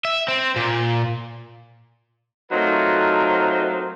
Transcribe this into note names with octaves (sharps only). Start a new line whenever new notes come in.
E5
C4
A#2
F#3 A3 C4 D#4 F4 A#4